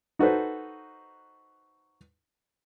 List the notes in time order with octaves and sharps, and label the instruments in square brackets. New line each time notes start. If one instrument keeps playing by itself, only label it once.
[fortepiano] D#4 F#4 A4 B4 C5